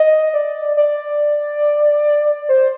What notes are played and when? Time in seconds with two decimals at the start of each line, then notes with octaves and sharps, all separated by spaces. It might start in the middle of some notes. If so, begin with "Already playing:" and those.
Already playing: D#5
0.34 D5
0.77 D5
2.49 C5